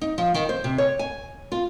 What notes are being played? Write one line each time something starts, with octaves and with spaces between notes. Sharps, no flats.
D#4
F3
D#3
C5
C3
C#5
G#5
F4